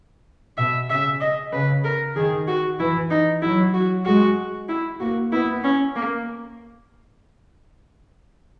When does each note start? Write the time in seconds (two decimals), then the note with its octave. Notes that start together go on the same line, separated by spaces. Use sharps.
0.57 B2 E5
0.89 C#3 E5
1.20 D#5
1.52 C#3 B4
1.84 A#4
2.16 D#3 G#4
2.48 F#4
2.79 E3 E4
3.11 D#4
3.42 F#3 E4
3.74 F#4
4.06 G#3 F#4
4.69 E4
5.00 A#3 F#4
5.32 B3 E4
5.64 C#4
5.96 A#3